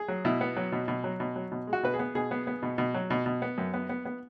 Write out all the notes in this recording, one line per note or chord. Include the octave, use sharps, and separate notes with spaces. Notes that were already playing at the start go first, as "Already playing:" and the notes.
Already playing: G#4
F#3
B2 E4
B3
F#3
B2
B2
F#3
B2
F#3
B2
G#3
F#4
B2 B4
G#4
B3
B2 G#4
B3
B3
B2
B2
F#3
B2
B2
B3
F#2
B3
B3
B3